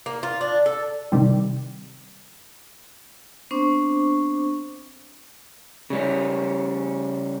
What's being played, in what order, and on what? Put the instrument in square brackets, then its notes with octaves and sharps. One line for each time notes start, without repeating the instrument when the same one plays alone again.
[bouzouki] A#3
F4
D4
A4
[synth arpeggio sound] C3 D#3 G3 C4
[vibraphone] B3 C4 D4 C5 C#6 D6
[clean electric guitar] C#3 G3 C#4